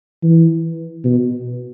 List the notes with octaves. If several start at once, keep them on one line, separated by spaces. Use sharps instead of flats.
E3
B2